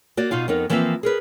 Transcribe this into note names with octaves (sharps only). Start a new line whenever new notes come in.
A#3 F#4 D5
B2 D#4 F4 F5
F2 B3 D#4 A#4
E3 F3 A#3 C4 D5 E5
G#4 A#4 B4